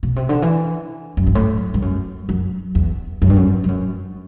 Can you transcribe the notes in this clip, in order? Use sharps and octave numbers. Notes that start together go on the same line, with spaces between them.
B2
C3
D3
E3
F#2
G2
A2
G2
F#2
F#2
E2
F#2
G2
F#2
G2
F#2